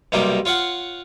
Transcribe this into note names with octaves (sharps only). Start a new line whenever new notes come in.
B1 C3 G3 A#3 D#4 G4
F4 C#5 F5 F#5